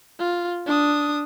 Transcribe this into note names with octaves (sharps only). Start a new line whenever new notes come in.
F4
D4 D#6